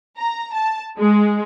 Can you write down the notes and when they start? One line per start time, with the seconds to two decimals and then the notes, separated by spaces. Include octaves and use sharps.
0.17 A#5
0.54 A5
0.98 G#3